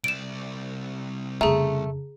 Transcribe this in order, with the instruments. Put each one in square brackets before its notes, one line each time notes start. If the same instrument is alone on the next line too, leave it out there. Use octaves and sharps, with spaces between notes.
[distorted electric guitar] C2 D5 [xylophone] D7 E7
[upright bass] F2 C#3 [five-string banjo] A3 [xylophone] G#4 A#5